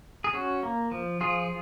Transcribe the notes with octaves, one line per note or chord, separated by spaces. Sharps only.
G#4
C#4 F#4
A#3
F3
F3 F4 G#4